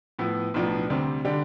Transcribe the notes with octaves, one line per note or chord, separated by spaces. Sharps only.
A2 F3 B3 E4
B1 A2 F3 B3 D4
D2 C3 G3 C4
D3 G3 D4 G4